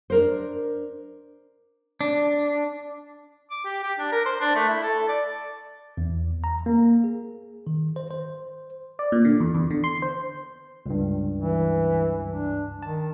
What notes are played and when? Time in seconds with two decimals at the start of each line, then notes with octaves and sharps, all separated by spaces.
0.10 D4 A#4 C5
2.01 D4
3.51 D6
3.65 G4
3.83 G4
3.99 D4
4.12 A#4
4.26 C5
4.41 D4
4.55 A3
4.69 E4
4.82 A4
5.09 D5
5.97 E2
6.44 A#5
6.66 A#3
7.04 G#4
7.67 D#3
7.96 C5
8.11 C5
8.99 D5
9.12 A#2
9.25 D3
9.40 E2
9.55 E2
9.71 D3
9.84 C6
10.02 C5
10.86 C#2 G2
11.40 E3
12.28 D4
12.83 D#3 A5